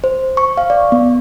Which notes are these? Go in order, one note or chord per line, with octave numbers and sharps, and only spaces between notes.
C5
C#6
F5
D5
B3